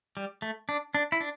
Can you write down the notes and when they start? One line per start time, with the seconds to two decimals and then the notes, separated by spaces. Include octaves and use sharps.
0.17 G3
0.42 A3
0.69 D4
0.95 D4
1.12 E4
1.21 D4